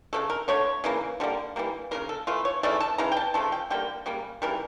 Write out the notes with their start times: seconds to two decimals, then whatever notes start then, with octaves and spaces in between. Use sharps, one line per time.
0.13 C#3 F3 A3 A4
0.30 A#4
0.48 D3 A3 C#5
0.84 C#3 E3 A#3
1.20 D3 G3 A#3
1.56 E3 G3 A#3
1.91 C#3 F3 A#3 A#4
2.09 A4
2.27 E3 A3 F4
2.45 C#5
2.63 C#3 E3 A3 D5
2.80 A5
2.98 C#3 E3 A#5
3.12 G5
3.17 A5
3.34 C#3 F3 A3 A5
3.52 G5
3.70 D3 G3 A#3 G5
4.06 C#3 G3 A#3
4.42 C#3 E3 G3 A#4